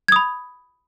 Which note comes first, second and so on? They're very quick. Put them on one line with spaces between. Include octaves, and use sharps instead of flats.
G#6 D#6 B5